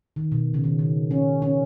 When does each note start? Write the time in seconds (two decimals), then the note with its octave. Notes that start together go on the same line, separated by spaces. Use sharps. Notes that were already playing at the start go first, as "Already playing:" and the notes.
0.16 D#3
0.32 B2
0.54 C#3
0.64 D#3
0.79 D#3
1.11 C#4
1.42 C#4